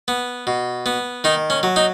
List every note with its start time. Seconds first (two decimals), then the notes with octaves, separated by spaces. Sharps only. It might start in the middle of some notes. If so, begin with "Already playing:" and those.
0.08 B3
0.47 B2
0.86 B3
1.24 D#3 D#4
1.50 C#4
1.63 F#3
1.76 D#4